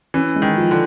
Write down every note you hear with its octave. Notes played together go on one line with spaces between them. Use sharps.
E3 C#4
G#3
D#3
F3
D3